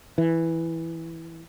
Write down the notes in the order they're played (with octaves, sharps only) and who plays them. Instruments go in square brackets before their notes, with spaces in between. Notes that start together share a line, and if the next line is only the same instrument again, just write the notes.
[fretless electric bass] E3